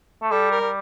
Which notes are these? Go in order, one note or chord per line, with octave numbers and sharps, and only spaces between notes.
A3
G3 A4
A#4
G3